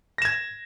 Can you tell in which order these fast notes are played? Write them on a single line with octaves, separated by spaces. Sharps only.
A#6 E7 G#6